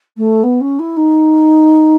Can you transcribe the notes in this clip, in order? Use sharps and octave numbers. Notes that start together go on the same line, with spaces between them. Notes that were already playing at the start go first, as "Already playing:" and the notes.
A3
B3
C#4
E4
D#4